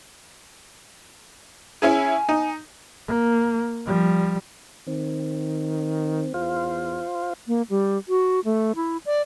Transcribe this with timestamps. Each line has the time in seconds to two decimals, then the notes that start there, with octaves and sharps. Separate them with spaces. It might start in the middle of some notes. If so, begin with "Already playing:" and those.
1.82 C#4 E4 G#4 G#5
2.29 D#4
3.08 A#3
3.86 F3 G3
4.87 D#3 C4
6.34 E2 F4 C5 F5
7.47 A#3
7.70 G3
8.09 F#4
8.45 A3
8.76 E4
9.06 D5